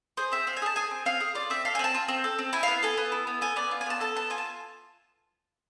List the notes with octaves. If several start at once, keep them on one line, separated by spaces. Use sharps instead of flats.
G#4 C5
C4 E5
C4 F5
G#5
G#4 A5
G#4 G#5
C4
C4 F5
G#4
F4 D5
C4 E5
A4 F5
G#5
C4 A5
F4
C4
A4
C4
E4 G#5
B3 F5
A4 G#5
B3
E4
B3
A4 G#5
B3 D5
F4
G#5
B3 A5
A4 A5
B3 A5
F4 G#5
A5